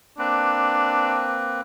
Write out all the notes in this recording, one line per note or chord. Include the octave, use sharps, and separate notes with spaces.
A#3 C4 D4 B4